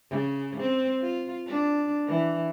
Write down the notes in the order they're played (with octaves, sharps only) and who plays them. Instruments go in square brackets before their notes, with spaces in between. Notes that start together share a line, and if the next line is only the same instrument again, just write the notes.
[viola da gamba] C#3
C4
F4
D4
E3